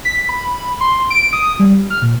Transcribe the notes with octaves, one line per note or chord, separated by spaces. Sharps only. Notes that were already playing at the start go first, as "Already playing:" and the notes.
B6
B5
C6
D7
D#6
G3
F6
A#2